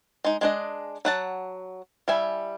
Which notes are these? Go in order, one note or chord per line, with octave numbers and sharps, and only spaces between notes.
G#3 D#4
G#3 D4 D#5
F#3 F#5 A5
G3 E4 E5 G#5